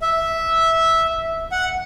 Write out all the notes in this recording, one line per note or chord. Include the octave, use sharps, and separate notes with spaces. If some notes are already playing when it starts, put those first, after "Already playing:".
E5
F#5